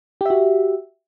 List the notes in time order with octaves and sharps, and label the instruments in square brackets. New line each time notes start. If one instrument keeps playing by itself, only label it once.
[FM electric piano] G4
E5
F#4